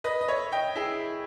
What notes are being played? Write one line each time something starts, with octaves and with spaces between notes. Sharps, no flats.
B4 D#5
D#5
C#5 E5
D#5 G5
E4 G#4